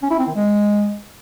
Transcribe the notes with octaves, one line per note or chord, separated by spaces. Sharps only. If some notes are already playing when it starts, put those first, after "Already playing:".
C#4
E4
C4
D#3
G#3